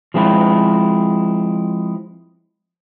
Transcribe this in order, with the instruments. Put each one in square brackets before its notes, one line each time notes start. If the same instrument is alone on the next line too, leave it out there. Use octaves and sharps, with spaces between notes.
[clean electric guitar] F3 G#3 C4 E4